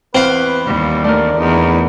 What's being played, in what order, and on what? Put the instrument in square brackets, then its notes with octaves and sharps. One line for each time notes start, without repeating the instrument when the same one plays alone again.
[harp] E2 [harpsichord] C4 F5 [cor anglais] B4
[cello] D#2 [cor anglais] G3
[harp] A3 D4 A#4 [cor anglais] D5
[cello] E2 [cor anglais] D#4